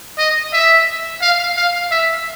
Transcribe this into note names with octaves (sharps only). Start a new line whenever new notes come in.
D#5
E5
F5
F5
E5